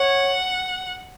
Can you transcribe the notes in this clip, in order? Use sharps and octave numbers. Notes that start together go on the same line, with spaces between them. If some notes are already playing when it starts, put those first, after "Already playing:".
Already playing: C#5 F#5